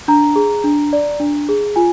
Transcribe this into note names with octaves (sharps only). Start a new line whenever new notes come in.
D4 A#5
G#4
D4
D5
D4
G#4
F4 G#5